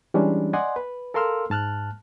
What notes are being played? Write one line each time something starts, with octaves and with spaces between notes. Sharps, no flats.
E3 G3 G#3 C#4 D4
D5 D#5 F#5 G#5 C6
B4
A4 A#4 F5 C6 E6 F6
G#2 A5 F6 F#6